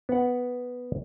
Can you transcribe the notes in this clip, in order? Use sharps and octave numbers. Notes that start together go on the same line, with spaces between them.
B3 F#5